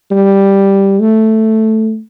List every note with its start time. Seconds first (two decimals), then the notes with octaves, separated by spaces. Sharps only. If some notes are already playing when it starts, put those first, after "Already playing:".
0.11 G3
1.00 A3